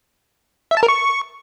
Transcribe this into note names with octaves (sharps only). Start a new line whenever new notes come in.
E5
A5
A#4
C#6